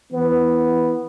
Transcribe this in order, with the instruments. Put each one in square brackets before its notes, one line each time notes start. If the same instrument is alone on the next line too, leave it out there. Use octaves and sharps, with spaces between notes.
[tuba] E3 [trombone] B3